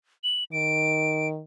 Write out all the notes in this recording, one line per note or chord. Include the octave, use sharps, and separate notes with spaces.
F#7
D#3 D7